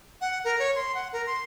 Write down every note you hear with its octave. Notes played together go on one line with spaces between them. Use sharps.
F#5
A#4
C#5
C6
F#5
A#4
C6